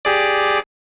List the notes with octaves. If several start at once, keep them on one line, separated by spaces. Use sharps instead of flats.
G4 G#4 D5